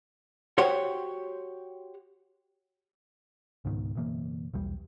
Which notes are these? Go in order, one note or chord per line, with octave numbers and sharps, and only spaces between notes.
F#4 G4 C5 C#5 F#5
C#2 G#2 B2 D#3
F#1 B2 E3 A#3
B1 E2 G3